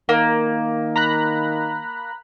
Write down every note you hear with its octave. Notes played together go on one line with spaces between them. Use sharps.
D#3 A#3
A#5 B5 F#6